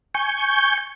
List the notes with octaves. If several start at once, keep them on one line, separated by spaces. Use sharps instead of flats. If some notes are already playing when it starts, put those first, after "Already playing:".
G#5 C#6 G6